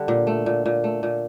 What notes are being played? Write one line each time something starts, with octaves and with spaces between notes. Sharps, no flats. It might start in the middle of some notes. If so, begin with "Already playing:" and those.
Already playing: D3 G3
A#2
A3
A#2
A#2
A3
A#2